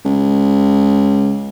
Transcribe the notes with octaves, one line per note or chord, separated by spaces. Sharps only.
C#2